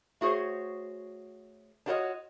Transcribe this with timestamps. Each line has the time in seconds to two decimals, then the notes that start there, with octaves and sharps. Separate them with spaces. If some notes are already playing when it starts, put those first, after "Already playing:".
0.21 A3 F#4 G#4 C5 C#5
1.86 D4 F4 F#4 A4 C#5 D#5